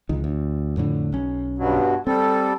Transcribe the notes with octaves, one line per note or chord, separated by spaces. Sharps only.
C#2 D#3
D2
F2 A2 D3
B1 C#4
G2 B2 F#3
G3 C4 A4